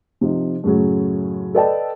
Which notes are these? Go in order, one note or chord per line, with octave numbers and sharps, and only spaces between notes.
C3 F3 D#4
F#2 A2 C#3 F#3
A4 B4 D5 D#5 G5 A5